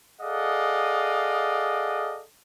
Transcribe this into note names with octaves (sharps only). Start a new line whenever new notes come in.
G#4 A4 D5 D#5 F5 F#5